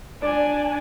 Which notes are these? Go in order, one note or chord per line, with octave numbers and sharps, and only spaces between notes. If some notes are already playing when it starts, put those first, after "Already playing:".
D4 D5 G#5